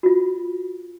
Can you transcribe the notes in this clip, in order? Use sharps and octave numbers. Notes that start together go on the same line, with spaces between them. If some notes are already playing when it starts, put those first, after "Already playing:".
F4 F#4